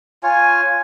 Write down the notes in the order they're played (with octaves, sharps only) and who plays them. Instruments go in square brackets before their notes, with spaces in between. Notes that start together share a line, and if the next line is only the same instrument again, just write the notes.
[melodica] F4 C#5 [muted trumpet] G#5